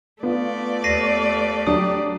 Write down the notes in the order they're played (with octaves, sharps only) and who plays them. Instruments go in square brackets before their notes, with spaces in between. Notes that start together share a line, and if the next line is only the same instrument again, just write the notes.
[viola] A3 D5 [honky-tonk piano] B3 F4
[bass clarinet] D#2 [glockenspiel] A#6 C7 D#7
[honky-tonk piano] F#3 D4 [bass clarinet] G4 [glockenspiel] D#6